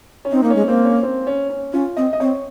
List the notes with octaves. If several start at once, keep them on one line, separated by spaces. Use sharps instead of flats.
C#4
C4 D#4
A#3 D#4
C#4
G#3
A#3 C4
C#4
C4
C#4
C#4
C#4 F4
C4 D#5
D#5
C4 C#5